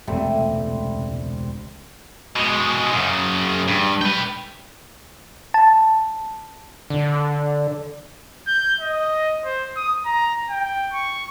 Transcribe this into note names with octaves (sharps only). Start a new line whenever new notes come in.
E1 C#2 C3 G3 A3 C4
B2 G#3
F#2 C#3
G2
B4 G5
A5
D3
G6
D#5
C5
D#6
A#5
G5
C#6